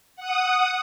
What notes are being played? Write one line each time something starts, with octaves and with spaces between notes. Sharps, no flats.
F#5 D#6